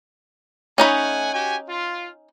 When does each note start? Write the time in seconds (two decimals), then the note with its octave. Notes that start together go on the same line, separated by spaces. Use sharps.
0.78 A3 C#4 D#4 F#5 G#5 B5
1.33 F#4 G4 G#5
1.69 F4